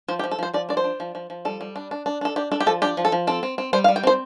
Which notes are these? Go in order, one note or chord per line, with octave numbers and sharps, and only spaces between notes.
F3 C5
G4
F3
A4
F3 C5
F3 D5
D4 D5
C5
D4
F3
F3
F3
G3 A4
G3
D4
D4
D4
D4 A4
D4 G4
D4 A4
G4
F3 A4
D4 G4
F3
A4
F3
C4 A4
C4
C4
G3 C5
F5
G3
G5
C4 C5